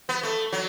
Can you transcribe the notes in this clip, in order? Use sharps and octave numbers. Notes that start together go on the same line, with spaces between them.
B3
A3
F#3